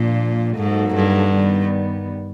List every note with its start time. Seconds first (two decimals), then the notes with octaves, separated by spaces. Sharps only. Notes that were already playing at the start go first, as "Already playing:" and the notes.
Already playing: A#2 F3 A#3 D4 F4
0.57 G#2 F#3 A#3 D#4 F#4 A4
0.95 G2
1.33 D#3 G3 B3